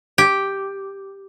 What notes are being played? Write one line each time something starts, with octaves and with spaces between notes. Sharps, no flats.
G4